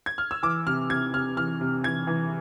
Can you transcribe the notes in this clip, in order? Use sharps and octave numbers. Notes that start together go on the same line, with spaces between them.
G#6
F6
E6
E3 D6
C3 F6
C3 G#6
C3 F6
E3 F6
C3
E3 G#6
E3